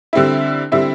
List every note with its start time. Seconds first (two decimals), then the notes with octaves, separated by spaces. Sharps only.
0.13 D3 G3 C4 E4
0.72 D3 G3 C4 E4